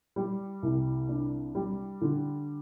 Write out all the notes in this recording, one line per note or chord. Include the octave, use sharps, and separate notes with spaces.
G3
C2
D4
G3
D3